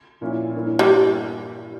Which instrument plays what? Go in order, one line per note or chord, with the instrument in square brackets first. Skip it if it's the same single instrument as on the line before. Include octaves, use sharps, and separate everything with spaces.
[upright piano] A#2 F3 A#3 C#4 E4
G2 E3 A#3 E4
[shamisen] G3